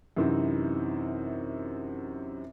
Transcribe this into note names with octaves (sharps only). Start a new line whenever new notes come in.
F#2 C3 E3 C4 D#4